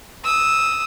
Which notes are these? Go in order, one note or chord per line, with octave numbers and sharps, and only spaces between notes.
D#6 E6